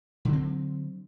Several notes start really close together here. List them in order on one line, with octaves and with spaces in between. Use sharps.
D3 F#3 C4